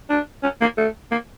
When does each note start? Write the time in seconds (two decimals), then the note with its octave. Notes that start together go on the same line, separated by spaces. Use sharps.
0.09 D4
0.43 C#4
0.61 A#3
0.77 A3
1.11 A#3